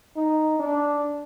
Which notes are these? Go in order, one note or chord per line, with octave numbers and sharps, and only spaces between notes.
D#4
D4